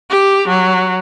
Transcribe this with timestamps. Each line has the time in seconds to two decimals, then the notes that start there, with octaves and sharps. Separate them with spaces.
0.10 G4
0.48 F#3